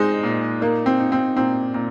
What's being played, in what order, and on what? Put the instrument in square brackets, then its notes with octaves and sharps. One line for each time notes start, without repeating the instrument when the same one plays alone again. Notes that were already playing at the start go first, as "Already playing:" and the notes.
Already playing: [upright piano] G#3 [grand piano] C4 D#4
[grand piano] A#2
[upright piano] A#3 [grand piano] D#4
[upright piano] C4
[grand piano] D#4
[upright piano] C4
[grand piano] A#2 [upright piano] C4
[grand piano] A#2